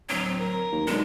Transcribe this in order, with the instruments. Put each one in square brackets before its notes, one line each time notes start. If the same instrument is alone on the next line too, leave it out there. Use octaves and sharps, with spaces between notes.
[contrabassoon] D1 [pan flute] F#3
[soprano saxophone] C4
A#4
[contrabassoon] D#2
[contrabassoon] B1 [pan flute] G#3 [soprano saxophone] D4